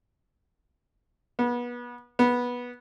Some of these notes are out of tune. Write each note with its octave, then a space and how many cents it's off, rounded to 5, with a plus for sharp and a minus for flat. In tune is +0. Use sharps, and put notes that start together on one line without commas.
B3 -30
B3 -15